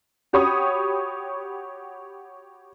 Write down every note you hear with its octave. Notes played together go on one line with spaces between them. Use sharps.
F#4 G4 C#5 B5 C#6 D#6